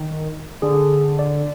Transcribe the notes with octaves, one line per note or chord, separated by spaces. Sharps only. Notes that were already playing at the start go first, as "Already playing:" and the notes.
Already playing: D#3
D3 G#4
D5